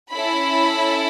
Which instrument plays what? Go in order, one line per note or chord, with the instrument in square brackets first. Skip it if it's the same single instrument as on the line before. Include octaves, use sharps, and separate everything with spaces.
[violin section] C#4 E4 A4 B5